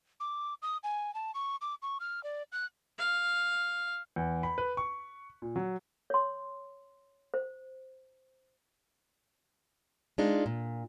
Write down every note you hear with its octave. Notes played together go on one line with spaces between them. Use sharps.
D6
D#6
G#5
A5
C#6
D6
C#6
F6
D5
F#6
F5
E2
B5
B4
C#6
A#2
F#3
C#5 C6
C5
G#3 D4 D#4 F4
A#2